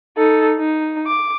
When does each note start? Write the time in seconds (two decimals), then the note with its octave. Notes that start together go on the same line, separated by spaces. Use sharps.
0.17 D#4 A4
0.59 D#4
1.07 D6